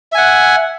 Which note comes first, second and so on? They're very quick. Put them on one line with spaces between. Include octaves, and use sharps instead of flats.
E5 G#5 F#5